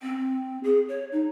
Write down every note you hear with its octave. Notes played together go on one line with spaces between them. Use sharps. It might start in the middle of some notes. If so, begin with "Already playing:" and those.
C4
G#4
C#5
D#4